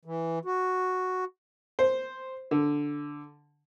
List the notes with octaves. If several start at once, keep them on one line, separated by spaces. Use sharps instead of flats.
E3
F#4
C5
D3